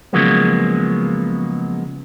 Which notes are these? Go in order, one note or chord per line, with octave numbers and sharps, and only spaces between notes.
C#3 F3 F#3 G#3 A#3 B3